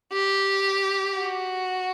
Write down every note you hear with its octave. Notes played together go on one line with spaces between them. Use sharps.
G4
F#4